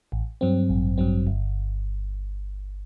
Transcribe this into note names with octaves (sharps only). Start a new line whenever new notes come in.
A1
G2 F#3 C4
A1
G2 F#3 C4
G1